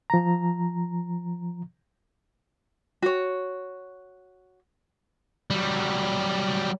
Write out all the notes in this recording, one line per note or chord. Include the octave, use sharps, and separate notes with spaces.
F3 A#5
F#4 C#5
F#3 G3